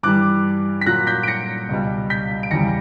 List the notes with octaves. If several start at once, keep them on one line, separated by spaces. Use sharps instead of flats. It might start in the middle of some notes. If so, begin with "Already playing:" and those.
G2 E3 G3 D6 F#6
B6
A#2 F#3 F#6 A#6
G6 B6
D7
A#6 C#7
C#2 B2 G3
G6 B6
D7
E2 C#3 G3 A#6 C#7